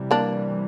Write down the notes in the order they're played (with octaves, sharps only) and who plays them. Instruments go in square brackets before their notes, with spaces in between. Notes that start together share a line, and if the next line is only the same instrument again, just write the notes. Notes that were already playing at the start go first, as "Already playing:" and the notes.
Already playing: [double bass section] C3 E3 G3
[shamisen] A#3 D4